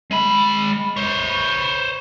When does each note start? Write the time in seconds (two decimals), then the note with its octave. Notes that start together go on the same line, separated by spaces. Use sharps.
0.11 G#3 B5
0.97 C5 C#5